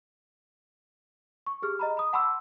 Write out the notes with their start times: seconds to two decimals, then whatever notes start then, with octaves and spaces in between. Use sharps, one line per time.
1.46 C#6
1.62 G4 G#4 F6
1.79 D#5 A#5 B5
1.97 B5 D#6
2.13 F#5 A5 B5 C6 D6 E6